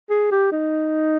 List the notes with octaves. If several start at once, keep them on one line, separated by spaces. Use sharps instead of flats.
G#4
G4
D#4